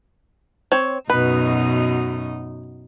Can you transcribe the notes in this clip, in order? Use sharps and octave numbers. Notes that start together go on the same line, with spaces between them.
C4 C#5
F#2 B2 D#4 B4